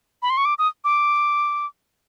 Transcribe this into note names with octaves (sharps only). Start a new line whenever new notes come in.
B5
C6
C#6
D6
D#6
D6